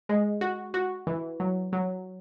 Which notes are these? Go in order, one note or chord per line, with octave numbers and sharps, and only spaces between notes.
G#3
F#4
F#4
E3
F#3
F#3